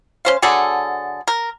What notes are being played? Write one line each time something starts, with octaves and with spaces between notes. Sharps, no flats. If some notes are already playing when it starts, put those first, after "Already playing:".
C#4 C5 F5
D3 F#3 G#4 A4
A#4